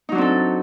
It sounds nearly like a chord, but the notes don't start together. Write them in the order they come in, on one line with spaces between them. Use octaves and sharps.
D#4 F#3 D4 C4 A4